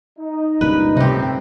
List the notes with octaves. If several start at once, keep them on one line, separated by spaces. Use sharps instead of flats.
D#4
C#2 G2 A#2 B4
A2 C3 G3 C4 D#4 G4